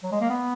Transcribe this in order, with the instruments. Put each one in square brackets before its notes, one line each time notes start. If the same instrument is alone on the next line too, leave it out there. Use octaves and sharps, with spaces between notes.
[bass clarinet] F#3
G#3
A#3
B3